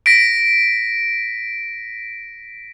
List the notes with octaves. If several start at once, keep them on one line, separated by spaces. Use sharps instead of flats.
A#6 B6 D7